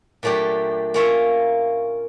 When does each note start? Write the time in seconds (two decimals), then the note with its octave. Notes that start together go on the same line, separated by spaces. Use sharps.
0.23 A#2 F#3 A3 D4 G4
0.94 A#3 C#4 F4 C#5 E5